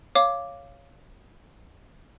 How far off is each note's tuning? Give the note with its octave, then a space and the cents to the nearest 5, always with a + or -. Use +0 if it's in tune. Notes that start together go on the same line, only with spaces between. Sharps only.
C#5 +0 F5 -10 D6 +0